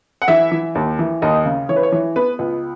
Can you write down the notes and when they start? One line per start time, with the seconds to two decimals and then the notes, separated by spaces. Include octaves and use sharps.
0.22 F#5
0.28 E3 E4 E5
0.52 E3
0.75 D#2
0.99 E3
1.22 D#2 D#4 D#5
1.46 C#3
1.69 E3 C#5
1.76 B4
1.83 C#5
1.92 E3
2.16 B3 B4
2.39 C#2